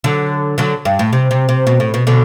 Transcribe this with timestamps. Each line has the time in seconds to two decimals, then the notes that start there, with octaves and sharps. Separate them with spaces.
0.04 D3 F#3
0.58 D3 F#3
0.85 G2
0.99 A2
1.13 C3
1.31 C3
1.49 C3
1.67 B2
1.80 A2
1.94 B2
2.07 B2 D3